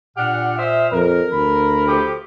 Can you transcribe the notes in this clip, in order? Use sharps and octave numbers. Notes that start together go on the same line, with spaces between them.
A#2 D4 G4 F#5 F6
C5 D#5 E5
F2 A#4
D2 B5
F3 A3 G4